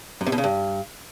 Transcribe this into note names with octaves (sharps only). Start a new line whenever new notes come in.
F#2
C3
B2
C#3
G2